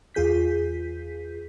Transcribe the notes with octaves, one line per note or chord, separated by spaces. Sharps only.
E2 F4 G#4 G6 B6